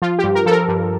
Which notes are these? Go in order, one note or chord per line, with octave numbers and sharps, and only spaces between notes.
F3 F4
G4
G2
A#4
F3 A4
A#4
G2